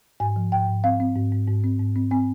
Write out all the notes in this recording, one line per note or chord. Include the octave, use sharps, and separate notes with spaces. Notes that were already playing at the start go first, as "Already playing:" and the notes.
G#2 G#5
F3
G#2 G5
G#2
C4 F5
C4
G#2
G#2
G#2
C4
G#2
C4
C4 G#5